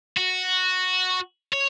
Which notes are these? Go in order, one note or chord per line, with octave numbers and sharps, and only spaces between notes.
F#4
C#5